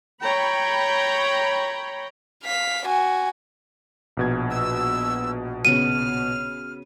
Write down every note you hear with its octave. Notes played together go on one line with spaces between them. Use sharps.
C#5 G5 A#5 B5
F5 B6
F#4 G#5
A#1 B2 G#6
E6
C#3 B3 F#4 F6 D#7